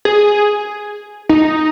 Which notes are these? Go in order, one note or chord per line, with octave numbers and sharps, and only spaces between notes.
G#4
D#4